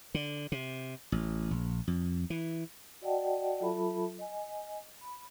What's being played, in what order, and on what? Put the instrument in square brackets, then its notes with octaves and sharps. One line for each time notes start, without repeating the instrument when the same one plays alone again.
[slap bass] D3
C3
A1
A#1
F2
E3
[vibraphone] F#4 D5 D#5 F#5 G5 A5
F#3 F4 A4 E5 A5 B5
D#5 G#5
B5